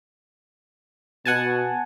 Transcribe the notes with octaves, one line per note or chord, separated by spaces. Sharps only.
B2 F#5 G#5 A5